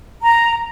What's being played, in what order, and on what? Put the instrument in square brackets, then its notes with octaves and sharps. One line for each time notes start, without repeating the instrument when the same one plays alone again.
[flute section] A#5